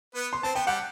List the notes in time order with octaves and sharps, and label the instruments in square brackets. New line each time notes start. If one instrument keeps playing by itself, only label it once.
[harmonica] B3 B4
[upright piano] C6
[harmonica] C4 C5 [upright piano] A5
[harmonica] B3 B4 [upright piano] G5
[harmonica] G3 G4 [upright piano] F#5